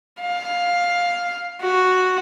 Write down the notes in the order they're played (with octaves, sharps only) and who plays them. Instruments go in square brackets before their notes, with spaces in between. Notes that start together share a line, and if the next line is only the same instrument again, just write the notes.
[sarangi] F5
F#4